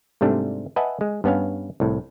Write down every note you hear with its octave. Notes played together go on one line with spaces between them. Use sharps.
G#2 C3 G3 A3 D4
B4 D#5 E5 F#5 G#5 A5
G#3
G2 B3 C#4 F5
C2 A2